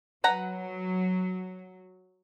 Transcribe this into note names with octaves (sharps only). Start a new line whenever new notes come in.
F#3 B4 F#5 A#5